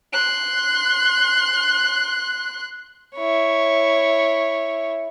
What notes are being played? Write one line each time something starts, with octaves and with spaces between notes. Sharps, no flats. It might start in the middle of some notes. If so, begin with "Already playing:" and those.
C6 F#6
E4 C#5